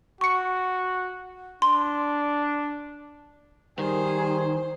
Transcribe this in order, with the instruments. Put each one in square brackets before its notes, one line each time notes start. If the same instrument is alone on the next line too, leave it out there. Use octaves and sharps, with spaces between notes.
[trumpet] F#4 [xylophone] C#6 C#7
[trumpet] D4 [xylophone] C6
[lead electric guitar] D#3 [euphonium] G3 [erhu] G#4 [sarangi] C5